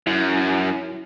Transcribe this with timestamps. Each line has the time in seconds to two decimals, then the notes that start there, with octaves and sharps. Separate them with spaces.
0.07 F#2 E4